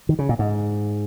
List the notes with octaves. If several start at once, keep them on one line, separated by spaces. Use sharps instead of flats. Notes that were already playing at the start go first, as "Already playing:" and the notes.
D#3
C#3
A#2
G#2